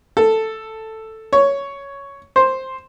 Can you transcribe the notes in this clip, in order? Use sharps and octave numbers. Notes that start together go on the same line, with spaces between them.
A4
C#5
C5